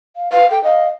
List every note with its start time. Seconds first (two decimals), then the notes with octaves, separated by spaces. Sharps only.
0.16 F5
0.32 B4 F5
0.51 A4 G5
0.64 D#5 F5